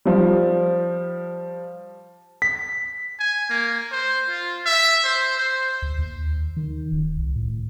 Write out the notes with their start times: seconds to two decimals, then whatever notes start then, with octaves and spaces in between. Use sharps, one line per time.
0.05 F3 G3
2.42 B6
3.20 G#5
3.50 A#3
3.92 C5
4.30 F4
4.66 E5
5.04 C5
5.37 C5
5.82 D2
5.98 D#2
6.57 D#3
6.92 D1
7.17 C2
7.36 A2